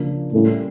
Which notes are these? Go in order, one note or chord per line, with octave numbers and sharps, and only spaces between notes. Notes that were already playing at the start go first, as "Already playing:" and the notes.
Already playing: C#3 F3 A#3 D4
A2 G3 A#3 C#4